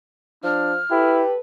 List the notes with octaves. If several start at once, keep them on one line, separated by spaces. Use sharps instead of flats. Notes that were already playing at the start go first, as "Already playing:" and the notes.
F3 D4 F6
E4 G4 A4 B4